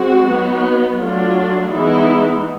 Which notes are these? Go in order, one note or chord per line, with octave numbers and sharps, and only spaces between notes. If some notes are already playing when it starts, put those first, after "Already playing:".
Already playing: G#3 C4 F#4
F#3 B3 D#4
F#3 A3 D4 F4
E3 G#3 B3 D#4 E4